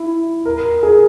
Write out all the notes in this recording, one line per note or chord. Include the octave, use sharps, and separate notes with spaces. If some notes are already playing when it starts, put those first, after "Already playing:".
Already playing: E4
A#4
G#4